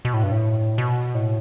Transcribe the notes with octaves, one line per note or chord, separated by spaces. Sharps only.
B2
A2
G2
A2
B2
A2